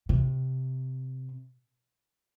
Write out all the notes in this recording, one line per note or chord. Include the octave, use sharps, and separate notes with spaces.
C3